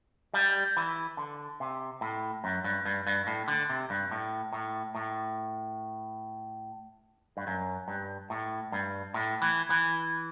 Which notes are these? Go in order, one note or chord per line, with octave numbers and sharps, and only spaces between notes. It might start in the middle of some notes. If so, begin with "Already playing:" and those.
G3
E3
D3
C3
A2
F#2
G2
G2
G2
A2
D3
C3
G2
A2
A2
A2
G2
F#2
G2
A2
G2
A2
E3
E3